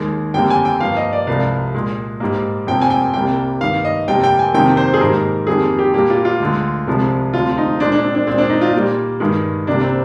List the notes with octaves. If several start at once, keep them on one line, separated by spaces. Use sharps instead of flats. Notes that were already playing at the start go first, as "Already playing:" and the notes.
Already playing: D#2 D#3 G#3
F2 D3 G3 A#3 G5
G#5
G5
G2 F3 A#3 F5
D#5
D5
C2 C3 F3 G#3 F5
A#2 G#3
G#2 G3 A#3
F2 C3 F3 A#3 G5
G#5
G5
C2 C3 G3 A#3 G5
G2 D#3 A#3 F5
D#5
F2 C3 G3 A#3 G5
G5
G#5
F2 C3 D#3 A#3 G5
C5
G#4
G#2 D#3 G3 A#3 A#4
F2 D#3 G3 A#3 G#4
G4
A#2 G3 A#3 G4
F4
F4
D2 D3 G#3
C2 C3 F3 G#3
D2 C3 F3 F4
D#4
A#2 G#3 D4
D4
C4
D4
A#2 G#3 C4
D4
D#4
F4
A#2 G3 A#3
G2 D#3 G#3
C2 C3 G3 A#3 D4
C4